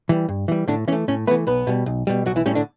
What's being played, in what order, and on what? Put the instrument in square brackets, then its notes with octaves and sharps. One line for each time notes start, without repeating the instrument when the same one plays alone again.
[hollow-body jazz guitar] E3 G3
G2
E3 G3
A2 D3 D4
E3 C#4
A3
A2 C#4
A3 B3 B4
E3
B1 B3 B4
B2 G3
B1
B2 G3
B1 F#3 F#4
E3 E4
A2 G3 C#4
D3 D4